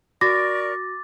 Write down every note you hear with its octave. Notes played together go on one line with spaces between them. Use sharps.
F#4 A#4 D5 C#6 D6 A6 A#6